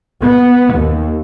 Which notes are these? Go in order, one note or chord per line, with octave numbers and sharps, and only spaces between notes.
B3
D#2